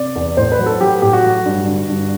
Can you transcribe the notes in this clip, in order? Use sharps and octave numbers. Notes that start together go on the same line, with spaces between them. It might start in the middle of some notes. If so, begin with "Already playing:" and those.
Already playing: C3 D5
E2
A2 C5
B4
F#3
A4
F#3 G4
A2 G4
F#4
F#3
G2
D3
G2